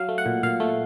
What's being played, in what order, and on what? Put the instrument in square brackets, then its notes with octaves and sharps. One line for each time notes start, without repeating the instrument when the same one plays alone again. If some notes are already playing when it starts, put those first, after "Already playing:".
Already playing: [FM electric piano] F#3 F5
A3
F#5
A#2
A#2 F5
A3